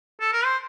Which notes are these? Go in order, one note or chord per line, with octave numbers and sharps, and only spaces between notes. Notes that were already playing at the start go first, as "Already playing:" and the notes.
A4
A#4
C5